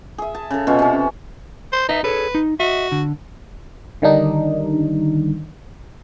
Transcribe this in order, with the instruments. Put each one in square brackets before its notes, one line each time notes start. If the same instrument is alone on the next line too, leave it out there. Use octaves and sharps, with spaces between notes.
[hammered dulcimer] G#4 E5
A5
C#3 A4
B2 C#4 F4
C3 C#4
[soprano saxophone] C5
[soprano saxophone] D#4 [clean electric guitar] B4 D#5 E5
[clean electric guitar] G#4 A4 C#5 [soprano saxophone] B4
[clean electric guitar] D#4
[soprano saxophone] F#4 [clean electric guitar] D#5 E5
[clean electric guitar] D3
[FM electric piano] D3 D#3 G3 D4 D#4